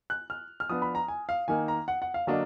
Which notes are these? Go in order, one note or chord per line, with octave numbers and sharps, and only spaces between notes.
F#6
F6
F6
F3 B3 D4 D#6
B5
A#5
G#5
F5
D#3 A#3 D#4 G#5
A#5
F#5
F#5
F5
D3 F#3 A#3 D4 D#5